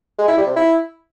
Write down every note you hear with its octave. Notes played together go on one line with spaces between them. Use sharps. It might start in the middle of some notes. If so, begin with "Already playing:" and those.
G#3
E4
G3
C3
E4